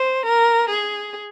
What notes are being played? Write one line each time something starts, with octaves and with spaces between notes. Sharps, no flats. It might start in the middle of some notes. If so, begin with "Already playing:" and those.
Already playing: C5
A#4
G#4